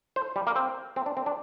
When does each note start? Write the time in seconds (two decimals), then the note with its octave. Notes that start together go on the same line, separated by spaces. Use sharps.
0.16 C5
0.36 G3
0.47 A#3
0.56 C4
0.96 C4
1.06 D4
1.17 C4
1.26 D4